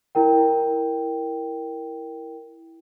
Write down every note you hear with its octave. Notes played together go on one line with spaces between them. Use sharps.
E4 A#4 G5